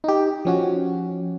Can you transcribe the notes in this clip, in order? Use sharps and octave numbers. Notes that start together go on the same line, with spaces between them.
D#4 G4
F3 C#4 F#4